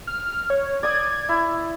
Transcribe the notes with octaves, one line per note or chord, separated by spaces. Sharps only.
F6
C#5
D5 D#6 G#6
E4